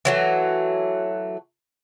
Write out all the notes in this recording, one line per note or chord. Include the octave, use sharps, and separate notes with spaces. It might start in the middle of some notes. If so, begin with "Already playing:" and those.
E3 F#3 A3